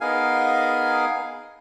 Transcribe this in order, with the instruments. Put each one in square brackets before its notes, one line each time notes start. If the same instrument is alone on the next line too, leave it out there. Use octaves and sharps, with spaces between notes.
[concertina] B3 D#4 G#4 A#4 F5 G#5